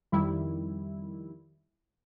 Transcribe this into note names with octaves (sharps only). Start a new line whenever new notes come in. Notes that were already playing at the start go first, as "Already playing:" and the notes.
F2 D#3 G3 E4